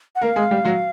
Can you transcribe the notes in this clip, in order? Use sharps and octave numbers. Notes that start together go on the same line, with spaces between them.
F#5
A#3 A#4 F5
G#3 G#4
G3 G4
F#3 F#4